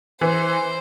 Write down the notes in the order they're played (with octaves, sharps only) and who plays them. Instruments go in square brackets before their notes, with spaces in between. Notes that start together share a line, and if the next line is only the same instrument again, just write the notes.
[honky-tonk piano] E3 [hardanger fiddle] C5